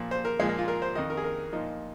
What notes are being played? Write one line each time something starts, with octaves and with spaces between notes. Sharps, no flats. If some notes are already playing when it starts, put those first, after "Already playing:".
Already playing: A#2 F3
C5
A#4
A#2 F3 G#3
A#3
F4
A#4
C5
F2 D#3 D#5
A#4
G#4
A#4
A#2 F3 D#4